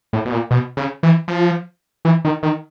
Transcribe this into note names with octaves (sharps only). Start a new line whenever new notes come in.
A2
B2
A#2
B2
C#3
E3
F3
E3
D#3
D#3